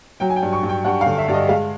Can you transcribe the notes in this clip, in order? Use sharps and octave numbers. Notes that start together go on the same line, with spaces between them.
F#3 G5
G#5
G5
G2
C#6
G2
G5
G2 F#5
F5
D3
E5
G2 D5 D#5
G#3 F5